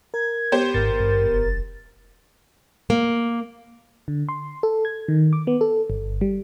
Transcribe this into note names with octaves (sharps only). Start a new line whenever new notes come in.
A#4 G#6
B3 G4 C5
G#1 G#2 A#4 A6
G2
F1
A#3
D3
C6
A4
G#6
D#3
D6
B3
A4
G1
G3